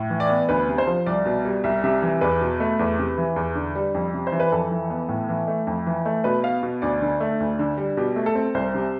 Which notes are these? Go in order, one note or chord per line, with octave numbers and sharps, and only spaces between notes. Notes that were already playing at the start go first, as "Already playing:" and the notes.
Already playing: A2
E3
D5
B3
D2 B4
C3
C5
F3
C2 D5
B2
G3
C2 E5
C3 E5
E3
E2 B4
B2
A3
E2
C3
E3
E2
D3
G3
F2
C3
C5
E3
B4
F2 A4
E3
B3
A2
E3
A3
F2
E3
A3
B2 B4
B3 F5
B2
D2 D5
D3
A3
D2
D3
G3
B2 G4
A3
A4
C4
C2 C5
C3